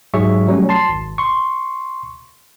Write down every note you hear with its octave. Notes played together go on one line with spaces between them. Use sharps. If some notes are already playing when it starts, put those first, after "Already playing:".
G#2 F#3 G#4 E5 C#6
F#3 G3 A3 C#4
A5 C6 C7
G#1
C6 C#6